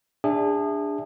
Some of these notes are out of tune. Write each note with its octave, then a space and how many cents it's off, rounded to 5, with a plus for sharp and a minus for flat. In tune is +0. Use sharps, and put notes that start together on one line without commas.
D4 +0 G#4 -30 E5 +0